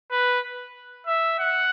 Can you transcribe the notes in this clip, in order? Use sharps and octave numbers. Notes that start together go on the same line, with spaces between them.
B4
E5
F#5